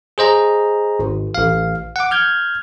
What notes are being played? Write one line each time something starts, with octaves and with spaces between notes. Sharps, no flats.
G#4 C5 D#5 A#5
G#1
A1 F5
F#5 D6
F6 G6 G#6